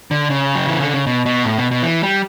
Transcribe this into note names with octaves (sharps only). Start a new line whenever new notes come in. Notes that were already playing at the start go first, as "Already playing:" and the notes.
D3
C#3
F#3
E3
D3
C#3
B2
B2
A2
B2
B2
E3
G3